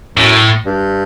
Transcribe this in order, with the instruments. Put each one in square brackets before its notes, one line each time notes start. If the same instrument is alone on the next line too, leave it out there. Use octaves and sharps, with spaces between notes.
[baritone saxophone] F#2 [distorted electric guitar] A2
[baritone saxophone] G2